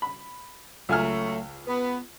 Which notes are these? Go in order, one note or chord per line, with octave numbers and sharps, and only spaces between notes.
B5
C#2 F#3 A3 G#5 F6
B3